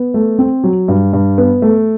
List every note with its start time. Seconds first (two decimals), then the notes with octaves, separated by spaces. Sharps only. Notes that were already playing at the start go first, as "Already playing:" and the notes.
Already playing: B3
0.14 A3
0.39 C4
0.64 F#3
0.88 G2
1.13 G2
1.38 B3
1.62 A3